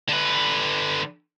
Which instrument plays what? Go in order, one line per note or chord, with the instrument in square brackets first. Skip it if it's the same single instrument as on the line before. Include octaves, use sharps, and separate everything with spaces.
[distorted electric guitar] D3 B4